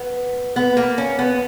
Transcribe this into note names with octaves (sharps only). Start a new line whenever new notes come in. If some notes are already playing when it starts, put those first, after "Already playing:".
Already playing: B3
B3
A#3
C#4
B3